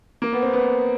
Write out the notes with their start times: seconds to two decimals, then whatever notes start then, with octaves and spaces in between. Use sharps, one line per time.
0.22 A#3
0.32 B3
0.42 C4
0.52 B3